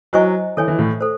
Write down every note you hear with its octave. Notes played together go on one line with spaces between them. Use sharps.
F#3 E4 C5 D#5 G#5 C#6
E3 A4 C#5 G#5
E3
A2
A4 C5